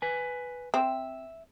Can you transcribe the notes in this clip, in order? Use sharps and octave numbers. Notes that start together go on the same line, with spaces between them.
B4 G#5
C4 E5